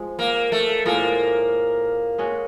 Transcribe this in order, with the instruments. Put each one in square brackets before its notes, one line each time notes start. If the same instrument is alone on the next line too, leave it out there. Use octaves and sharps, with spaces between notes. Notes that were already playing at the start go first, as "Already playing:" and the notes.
Already playing: [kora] F3 G#3
[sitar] A#3
A3
[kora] A2 F3 G#3 [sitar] A#3
[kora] G#3 C#4 F#4